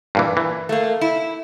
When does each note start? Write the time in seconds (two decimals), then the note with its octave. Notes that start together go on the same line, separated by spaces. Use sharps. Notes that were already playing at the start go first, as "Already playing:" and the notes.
0.15 G2 A#2 E3
0.37 E3
0.69 A3 A#3
1.01 E4